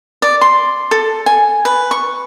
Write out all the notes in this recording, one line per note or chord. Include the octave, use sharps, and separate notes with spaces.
D5
C6
A4
G#5
B4
C#6